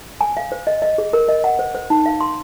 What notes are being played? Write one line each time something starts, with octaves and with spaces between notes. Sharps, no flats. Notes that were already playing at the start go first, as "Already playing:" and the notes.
G#5
F5
C5
D#5
D#5
G#4
A#4
D#5
F#5
C5
C5
D#4
F5
C6